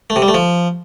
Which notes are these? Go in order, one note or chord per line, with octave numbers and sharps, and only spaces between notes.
A3
C3
G3
A3
F3